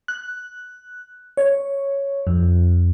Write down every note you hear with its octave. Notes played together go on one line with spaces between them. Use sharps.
F#6
C#5
F2